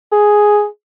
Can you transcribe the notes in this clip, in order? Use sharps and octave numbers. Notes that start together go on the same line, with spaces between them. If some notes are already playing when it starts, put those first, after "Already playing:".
G#4